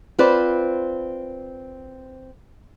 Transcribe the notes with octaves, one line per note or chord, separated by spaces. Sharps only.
C4 F4 B4 C5 D5